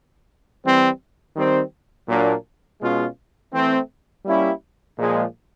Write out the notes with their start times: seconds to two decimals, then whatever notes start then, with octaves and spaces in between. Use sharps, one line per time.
0.65 E3 G3 C4
1.36 D#3 G3 C4
2.08 A#2 F#3 A#3 D4
2.81 B2 G#3 C#4 F4
3.54 E3 A3 C4
4.25 G3 A#3 C#4 E4 G4
4.98 A#2 F3 G#3